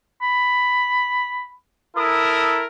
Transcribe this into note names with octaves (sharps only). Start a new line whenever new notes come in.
B5
E4 A4 A#4 D#6